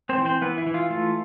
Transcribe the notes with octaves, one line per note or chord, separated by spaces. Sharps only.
C4 C5
E3
C4 C5
E3 B3 B4
E4
E3
F4
A3 F4